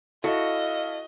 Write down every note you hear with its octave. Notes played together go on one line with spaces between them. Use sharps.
E4 F#4 A4 D#5 F5